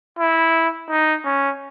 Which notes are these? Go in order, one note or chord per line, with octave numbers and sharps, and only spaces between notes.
E4
D#4
C#4